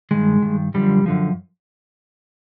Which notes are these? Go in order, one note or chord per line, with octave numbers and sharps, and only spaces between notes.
G2 D#3 G#3
G2 D#3
F#2 D3 F3 G3
F#2 D3 F3